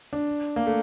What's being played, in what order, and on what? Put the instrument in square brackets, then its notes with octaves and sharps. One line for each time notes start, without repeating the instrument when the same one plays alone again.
[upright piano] D4
A#3
A3